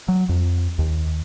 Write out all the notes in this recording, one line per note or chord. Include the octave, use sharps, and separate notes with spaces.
F#3
F2
D#2